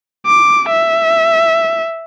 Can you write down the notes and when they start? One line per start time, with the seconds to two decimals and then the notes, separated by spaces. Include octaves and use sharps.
0.26 D6
0.69 E5